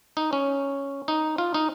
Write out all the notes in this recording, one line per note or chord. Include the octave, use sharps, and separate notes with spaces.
D#4
C#4
D#4
F4
D#4